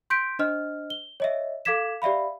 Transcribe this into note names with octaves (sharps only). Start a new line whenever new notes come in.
C6 G6 B6 D7
D4 C5 D#5 F6
G7
C#5 D#5 E5
A4 F5 D6 G#6 B6 E7
G4 D5 E5 F5 B5